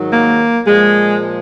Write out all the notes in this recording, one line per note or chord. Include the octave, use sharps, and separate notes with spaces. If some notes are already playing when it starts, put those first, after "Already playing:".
Already playing: G#2 D#3 F#3
A#3
A#2 F3 G#3